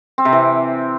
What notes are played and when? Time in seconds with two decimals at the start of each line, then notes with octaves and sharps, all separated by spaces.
0.18 C4
0.25 C3
0.32 E3